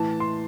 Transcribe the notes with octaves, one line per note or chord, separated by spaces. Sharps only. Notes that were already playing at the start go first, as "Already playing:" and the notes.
Already playing: A2 E3 A5
C6